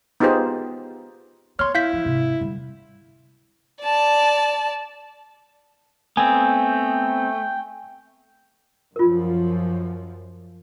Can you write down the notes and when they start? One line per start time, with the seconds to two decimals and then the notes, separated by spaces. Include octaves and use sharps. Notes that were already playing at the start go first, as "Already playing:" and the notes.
0.20 B3 D#4 F4 G4 G#4 C5
1.59 B3 C#5 C6 F6
1.75 E4 F5 G6 B6
1.93 F3
2.05 G#1 C3
2.41 D3 G3
3.83 D5 A5
6.17 A3 B3 C4 G5 G#5
8.96 F#2 F3 F4 A#4